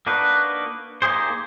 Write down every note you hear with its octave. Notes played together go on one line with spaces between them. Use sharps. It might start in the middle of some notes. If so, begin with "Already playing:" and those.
A#3 D4 D#4 F#4 B4
A#3 D#4 G4 G#4 C5